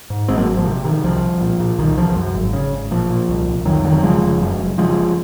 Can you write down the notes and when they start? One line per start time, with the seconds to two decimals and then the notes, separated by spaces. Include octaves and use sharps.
0.10 G#2
0.28 G#1 G#3 C4
0.38 F#3 A#3
0.47 G#1
0.57 F3
0.66 C3
0.84 C3 D#3
1.04 C2 F3
1.23 C2
1.41 A#2
1.60 A#2
1.79 C2 D#3
1.97 C2 F3
2.16 F#2
2.34 G#1
2.53 C#3
2.72 G#1
2.91 A#2 F3
3.09 A#2
3.29 C2
3.48 C2
3.65 F2 D#3 F#3
3.84 F1 D#3 F#3
4.03 C#3 F3 G#3
4.22 F1
4.41 F#2
4.60 F#1
4.78 C#3 F3 G#3
4.97 F#1